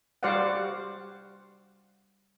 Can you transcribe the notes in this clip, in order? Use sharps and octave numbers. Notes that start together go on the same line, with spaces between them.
G3 F#4 C5 D5 F5 F#5